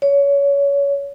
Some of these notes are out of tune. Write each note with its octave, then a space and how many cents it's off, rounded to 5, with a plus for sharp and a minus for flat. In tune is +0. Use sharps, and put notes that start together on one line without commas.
C#5 +25